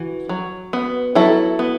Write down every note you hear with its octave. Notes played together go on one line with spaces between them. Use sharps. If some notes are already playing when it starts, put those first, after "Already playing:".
Already playing: E3 F#4
F#3
B3
F#3 E4 A4
B3